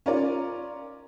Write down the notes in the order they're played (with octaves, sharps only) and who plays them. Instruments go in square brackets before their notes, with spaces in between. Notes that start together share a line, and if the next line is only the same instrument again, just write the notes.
[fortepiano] C#4 F4 A#4 D5